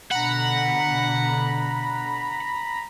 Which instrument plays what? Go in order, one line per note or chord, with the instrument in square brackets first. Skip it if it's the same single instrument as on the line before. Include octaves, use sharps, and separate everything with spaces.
[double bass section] B2 D3 [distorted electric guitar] F#5 [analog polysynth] A#5 B5